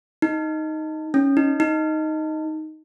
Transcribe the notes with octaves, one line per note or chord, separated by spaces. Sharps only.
D#4
C#4
D#4
D#4